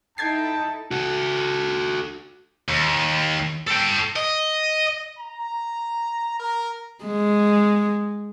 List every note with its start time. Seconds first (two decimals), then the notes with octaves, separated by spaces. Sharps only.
0.18 D#4 E4 A4 G5 A5 G#6 A6 C7
0.91 F#4 A4
2.68 D#2
3.67 A4 G5
4.16 D#5
5.19 A#5
6.40 A#4
7.04 G#3